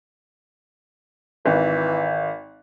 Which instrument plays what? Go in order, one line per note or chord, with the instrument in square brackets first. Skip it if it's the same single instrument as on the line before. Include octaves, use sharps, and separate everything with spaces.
[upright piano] G#1 [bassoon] E3